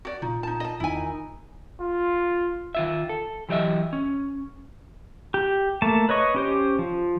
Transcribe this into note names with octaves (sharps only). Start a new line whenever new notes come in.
F#4 D5
A#2 D#4 F4
D#4 A5
D#5 A5
E2 D#3 D#4 E4 G#5
F4
D#3 F4 E5
A4
E3 F#3 G4 B4 D#5 E5
C#4
G4
A3 A#3 A5
B4 C#5 D#5 C#6
C#4 G4 C5
F3